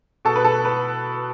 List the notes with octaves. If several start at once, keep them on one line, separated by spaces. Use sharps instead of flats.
B2 A4
B4
A4
B4